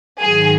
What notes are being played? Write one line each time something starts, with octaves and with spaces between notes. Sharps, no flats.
G#2 D#3 F#3 G#4